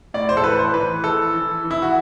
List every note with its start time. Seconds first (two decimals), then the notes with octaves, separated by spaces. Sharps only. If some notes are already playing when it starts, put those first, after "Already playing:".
0.14 A2 D5
0.29 C5
0.37 A4
0.44 E3 B4
0.59 C5
0.74 E3 B4
1.04 E3 A4
1.34 E3
1.64 E3
1.71 E4
1.82 F#4